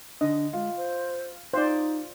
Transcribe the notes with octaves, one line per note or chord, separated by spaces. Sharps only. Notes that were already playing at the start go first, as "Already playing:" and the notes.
D3 D#5
G#3 F4
C5
D#4 F4 C5 D5